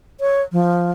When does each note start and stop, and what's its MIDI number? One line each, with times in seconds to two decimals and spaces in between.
0.20 0.42 73
0.52 0.91 53